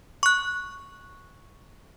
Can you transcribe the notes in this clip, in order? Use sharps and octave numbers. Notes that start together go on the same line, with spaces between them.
C#6 F#6